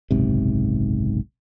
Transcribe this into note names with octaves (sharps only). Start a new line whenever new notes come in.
F#1 B1 G#2 C3